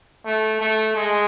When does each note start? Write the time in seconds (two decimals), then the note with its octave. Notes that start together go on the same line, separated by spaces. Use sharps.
0.26 A3
0.61 A3
0.96 G#3